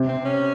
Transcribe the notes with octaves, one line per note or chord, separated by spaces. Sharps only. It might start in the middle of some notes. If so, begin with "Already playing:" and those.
Already playing: C3
C4
C#4